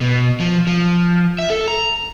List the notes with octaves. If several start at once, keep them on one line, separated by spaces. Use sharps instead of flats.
B2
F3
F3
E5
A4
A#5